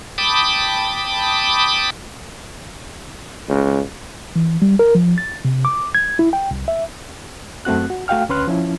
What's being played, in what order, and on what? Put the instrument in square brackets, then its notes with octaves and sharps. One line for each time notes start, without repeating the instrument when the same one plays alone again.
[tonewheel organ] G5 A5 B5 D6 D#6
[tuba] C#2
[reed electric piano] E3
G3
A#4
F3
A6
C3
D6
G#6
E4
G5
C2
E5
F#2 A3 C4 F#4 F#6
F#4
A3 F#4 F5 G5 F6
D2 C#4 B4 C6 F6 F#6
F3 C#4 E4